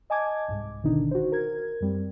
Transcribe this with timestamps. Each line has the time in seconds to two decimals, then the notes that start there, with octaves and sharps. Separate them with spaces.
0.10 D#5 G#5 A5 D6 G#6
0.48 C2 G#2
0.83 G1 B2 D3 D#3 D4 D#4
1.11 F#4 C5
1.32 A#4 G#6
1.81 F#2 G3 C4